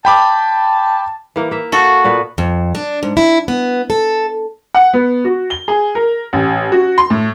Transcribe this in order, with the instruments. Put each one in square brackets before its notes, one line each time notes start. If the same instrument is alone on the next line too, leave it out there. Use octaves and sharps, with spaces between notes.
[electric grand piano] G5 B5 D6 [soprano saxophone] A5
[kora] E3 A#3
A#3 E5
[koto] F#4 A4 [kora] F5
[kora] A#2 B3 B4
[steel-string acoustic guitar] F2
D4
G#2
E4
B3
A4
[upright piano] F#5
B3
F#4
G7
G#4
A#4
A1
F#4
C6
A2